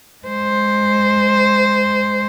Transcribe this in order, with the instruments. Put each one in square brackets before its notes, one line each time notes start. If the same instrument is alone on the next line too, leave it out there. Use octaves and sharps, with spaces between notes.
[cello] G#3 C5